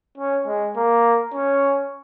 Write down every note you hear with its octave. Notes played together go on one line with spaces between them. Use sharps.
C#4
G#3
A#3
C#4